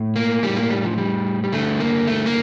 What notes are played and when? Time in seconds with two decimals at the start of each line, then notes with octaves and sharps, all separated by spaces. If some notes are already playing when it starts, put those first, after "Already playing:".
Already playing: A2
0.16 A#3
0.43 A2 G3
0.57 A#3
0.70 G3
0.84 F3
0.98 G3
1.44 G3
1.52 G2 D3 A3
1.80 A#3
2.07 A3
2.26 A#3